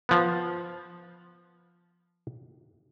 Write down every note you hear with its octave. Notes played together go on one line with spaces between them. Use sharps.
F3 B3